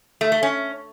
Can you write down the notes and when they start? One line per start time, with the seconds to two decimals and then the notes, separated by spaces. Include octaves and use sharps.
0.21 A3
0.32 A3
0.43 C#4